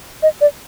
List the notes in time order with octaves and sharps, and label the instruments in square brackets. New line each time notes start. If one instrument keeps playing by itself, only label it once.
[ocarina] D#5
D5